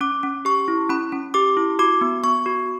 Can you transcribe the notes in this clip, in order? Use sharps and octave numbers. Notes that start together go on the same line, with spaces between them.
C#4 D6
C#4
G4 C#6
E4
C#4 B5
C#4
G4 D6
E4
F#4 D6
B3
B3 C#6
F#4